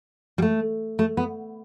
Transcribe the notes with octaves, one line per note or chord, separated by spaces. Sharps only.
G3
A3
A3
B3